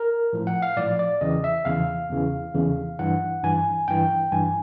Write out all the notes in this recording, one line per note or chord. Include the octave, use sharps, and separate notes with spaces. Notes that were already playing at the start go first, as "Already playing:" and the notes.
Already playing: A#4
A2 F3
F#5
F5
A2 F3 D5
D5
E2 C#3 E3 D#5
E5
E2 C#3 E3 F5
E2 C#3 E3
E2 C#3 E3
G2 E3 F#5
G2 E3 G#5
G2 E3 G5
G2 E3 G#5